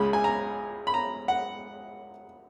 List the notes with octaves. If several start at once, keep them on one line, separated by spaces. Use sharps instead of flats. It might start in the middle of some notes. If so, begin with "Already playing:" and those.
Already playing: C#2 C#3 G#3 B5
G#5
A#5
B5
A#5
F#5